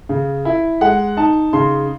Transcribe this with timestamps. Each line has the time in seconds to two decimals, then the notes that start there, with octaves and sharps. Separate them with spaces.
0.09 C#3
0.45 E4
0.81 G#3 F#5
1.17 D#4 A5
1.53 C#3 C6